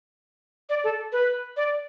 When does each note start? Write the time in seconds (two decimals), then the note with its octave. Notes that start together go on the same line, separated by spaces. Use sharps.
0.69 D5
0.84 A4
1.12 B4
1.57 D5